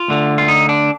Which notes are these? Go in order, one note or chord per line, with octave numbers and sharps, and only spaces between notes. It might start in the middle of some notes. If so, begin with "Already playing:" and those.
Already playing: F4
D2 D3
F4
D#4
D4